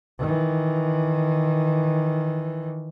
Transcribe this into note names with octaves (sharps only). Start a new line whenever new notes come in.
D#3 E3